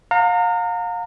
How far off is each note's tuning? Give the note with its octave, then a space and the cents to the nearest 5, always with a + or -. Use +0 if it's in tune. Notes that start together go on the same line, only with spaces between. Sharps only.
F5 +35 A#5 -30